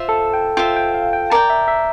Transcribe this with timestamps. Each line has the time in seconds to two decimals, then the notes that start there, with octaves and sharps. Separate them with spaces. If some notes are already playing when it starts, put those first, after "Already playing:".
Already playing: F4 C5 E5
0.09 A4
0.34 G5
0.57 F4 C5 E5 G5
0.76 G5
0.94 F5
1.13 G5
1.30 A#4 D5 G5 A5
1.50 E5
1.68 E5